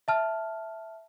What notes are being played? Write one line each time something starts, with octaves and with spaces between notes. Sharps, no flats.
E5 A5 F6